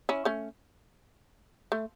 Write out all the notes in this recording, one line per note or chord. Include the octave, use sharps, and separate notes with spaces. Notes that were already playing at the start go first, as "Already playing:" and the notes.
C#4 E4
A3 C#4
A3